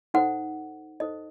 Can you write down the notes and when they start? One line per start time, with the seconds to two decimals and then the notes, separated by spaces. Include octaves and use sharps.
0.14 D#4 A4 C5 F#5
1.00 D#4 A4 C5 D#5